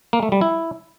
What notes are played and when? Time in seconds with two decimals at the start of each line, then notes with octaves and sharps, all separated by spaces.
0.13 A#3
0.23 A3
0.32 G3
0.41 E4